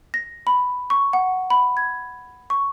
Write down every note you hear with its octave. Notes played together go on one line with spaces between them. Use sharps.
A#6
B5
C#6
F#5
B5
G#6
C#6